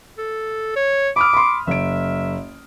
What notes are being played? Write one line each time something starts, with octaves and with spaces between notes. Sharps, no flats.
A4
C#5
B5 D6 D#6 F6
B5 C6
F#1 E5 D7